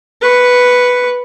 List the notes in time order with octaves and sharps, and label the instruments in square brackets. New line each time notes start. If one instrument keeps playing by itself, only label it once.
[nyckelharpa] B4 C#6